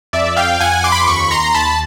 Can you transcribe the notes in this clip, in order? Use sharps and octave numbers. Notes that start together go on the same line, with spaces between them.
F2 D5 E5
F5 G5
F2 F#5 G#5
C6 D6
B5
C6
D#2 B5 C#6
A#5 C6
D#2 A5 B5